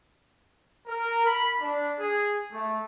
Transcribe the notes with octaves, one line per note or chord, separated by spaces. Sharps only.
A#4
B5
D4
G#4
A3